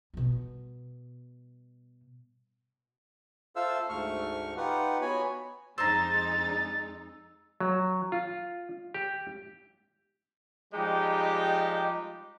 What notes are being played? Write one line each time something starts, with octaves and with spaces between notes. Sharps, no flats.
B2 G3
F4 A4 C5 E5 F5 E6
D2 G#2 A3 C#6 F6
D#4 F4 G4 B4 F#5
B3 F#4 C#5 G#5 B5
F2 G#3 D#4 C5 A#5 E6 A6
F#3
F4
G4
F3 G3 G#3 D#4 G4